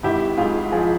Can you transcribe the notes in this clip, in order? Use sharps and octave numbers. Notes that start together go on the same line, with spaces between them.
G#1 E4 G4
G#2 F4 G#4
F3 F4 G#4